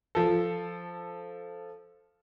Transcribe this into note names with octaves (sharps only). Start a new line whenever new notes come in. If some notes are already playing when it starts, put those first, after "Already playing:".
F3 A4